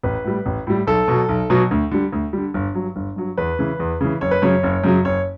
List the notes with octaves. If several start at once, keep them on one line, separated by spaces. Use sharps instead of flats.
A1 B4
A2 G3
A1
A2 G3
B1 A4
B2 F#3
B1
B2 F#3
D2
D3 G3
D2
D3 G3
G1
G2 F#3
G1
G2 F#3
E2 B4
C#3 E3
E2
C#3 E3
F#1 C#5
B4
F#2 C#3 F#3 C#5
F#1
F#2 C#3 F#3
F#1 C#5